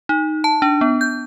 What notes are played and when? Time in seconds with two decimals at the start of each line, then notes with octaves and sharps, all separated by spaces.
0.09 D#4
0.44 A5
0.62 D4
0.81 B3
1.01 G6